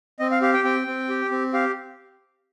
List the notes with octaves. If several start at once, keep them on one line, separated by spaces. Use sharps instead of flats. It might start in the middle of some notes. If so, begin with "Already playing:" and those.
C4 D#5
F5
G4 F5
G5
C4 G5
C4
G4
C4
G4 F5